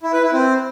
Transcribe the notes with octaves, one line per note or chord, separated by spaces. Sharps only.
E4
B4
E4
C4